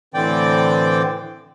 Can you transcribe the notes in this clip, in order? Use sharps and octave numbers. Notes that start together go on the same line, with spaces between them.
A2 D3 E3 C4 D5 G5